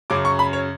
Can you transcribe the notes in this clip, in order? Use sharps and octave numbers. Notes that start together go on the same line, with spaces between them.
F#2 C#3 F#3 D6
C#6
B5
C#5